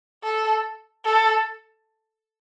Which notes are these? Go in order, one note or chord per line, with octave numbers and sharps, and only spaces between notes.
A4
A4